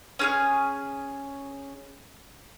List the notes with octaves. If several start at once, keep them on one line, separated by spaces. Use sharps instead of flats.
C#4 G#4 F6